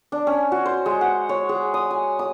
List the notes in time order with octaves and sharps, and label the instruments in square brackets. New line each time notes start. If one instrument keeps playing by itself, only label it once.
[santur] D4
C#4
F#4
C5
G#3
F#5
C#5
G#4
D#6
G#5
D#6